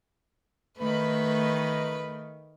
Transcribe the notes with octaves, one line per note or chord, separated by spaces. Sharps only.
D#3 A3 B4 B5